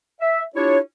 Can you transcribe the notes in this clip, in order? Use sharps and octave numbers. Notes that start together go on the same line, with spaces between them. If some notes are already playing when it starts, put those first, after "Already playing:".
E5
D4 E4 F4 G4 C#5